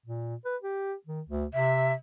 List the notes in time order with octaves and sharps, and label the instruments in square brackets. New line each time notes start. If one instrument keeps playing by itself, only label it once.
[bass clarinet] A#2
B4
G4
D#3
D2
[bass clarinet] C3 [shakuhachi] E5